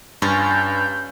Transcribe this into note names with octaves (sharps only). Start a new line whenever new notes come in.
G2 C#4 F4 G6